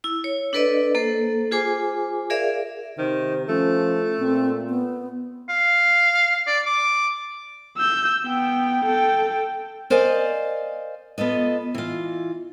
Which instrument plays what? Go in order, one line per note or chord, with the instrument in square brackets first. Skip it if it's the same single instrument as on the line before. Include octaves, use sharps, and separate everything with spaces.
[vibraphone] E4 E6
C#5
D4 A4 B4 D5 D#5
A#3 A4 C5
F4 G#4 C5 G#5 D6
G#4 A#4 D5 E5 F5
[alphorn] C3 [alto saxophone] D#3 [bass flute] C5
[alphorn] F3 [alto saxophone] A3 [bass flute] C#4
[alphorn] A#2 [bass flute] C4
[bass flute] B3
[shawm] F5
D5
D6
[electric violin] E6 G6
B3 G5
A4 G5
[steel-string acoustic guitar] A#4 C5 D5 D#5 F5 G#5
B3 F4 A4 D#5
E3 F4